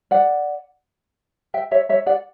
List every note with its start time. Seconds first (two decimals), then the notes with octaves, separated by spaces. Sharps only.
0.11 D5 F#5
1.54 E5 G5
1.71 C#5 E5
1.89 C#5 E5
2.06 D5 F#5